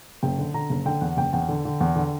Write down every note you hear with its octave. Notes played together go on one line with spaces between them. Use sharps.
F#1 G5
D3
D3 A#5
F#1
D3 G5
E2 F#5
F#1 G5
E2 G5
D3
D3
E2
D3